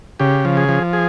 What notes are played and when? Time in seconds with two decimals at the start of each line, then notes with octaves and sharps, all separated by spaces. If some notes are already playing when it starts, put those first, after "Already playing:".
0.20 C#3 G4
0.45 F3
0.57 G#4
0.69 F3
0.93 G#4